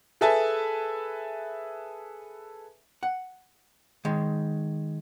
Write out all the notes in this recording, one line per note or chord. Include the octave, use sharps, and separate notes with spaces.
G#4 A4 B4 E5 G#5 A5
F#5
D#3 G#3